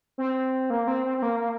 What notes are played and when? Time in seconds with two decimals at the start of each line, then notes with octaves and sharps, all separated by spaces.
0.18 C4
0.70 A#3
0.87 C4
1.05 C4
1.18 C4
1.22 A#3
1.39 A#3